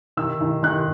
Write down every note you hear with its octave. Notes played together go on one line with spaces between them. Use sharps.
D#3 E6
D#3
D#3 F#6